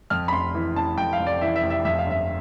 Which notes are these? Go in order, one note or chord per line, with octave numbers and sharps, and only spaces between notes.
F2 F6
B5
F1 C6
E3
F1 A5
F2 G5
F5
F1
D5
E3 E5
E5
F1
E5
F2 E5
F5
G1 E5